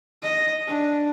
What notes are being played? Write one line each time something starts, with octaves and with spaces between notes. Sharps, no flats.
D#5
D4